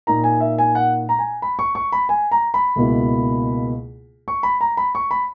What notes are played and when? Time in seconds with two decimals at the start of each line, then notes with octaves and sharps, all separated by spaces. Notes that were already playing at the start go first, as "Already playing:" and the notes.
0.07 A#2 A#3 D#4 A#5
0.24 G#5
0.40 E5
0.58 G#5
0.75 F#5
1.09 A#5
1.19 G#5
1.42 B5
1.59 C#6
1.75 C#6
1.92 B5
2.09 G#5
2.31 A#5
2.54 B5
2.76 C#2 B2 A#3 E4
4.28 C#6
4.43 B5
4.61 A#5
4.77 B5
4.95 C#6
5.11 B5